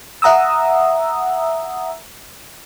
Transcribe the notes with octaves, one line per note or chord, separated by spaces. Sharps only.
E5 F#5 A#5 D#6 E6